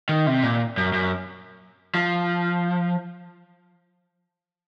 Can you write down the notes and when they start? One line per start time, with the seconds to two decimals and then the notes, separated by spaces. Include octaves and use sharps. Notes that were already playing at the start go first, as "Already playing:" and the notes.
0.09 D#3
0.27 C3
0.43 A#2
0.77 F#2
0.93 F#2
1.95 F3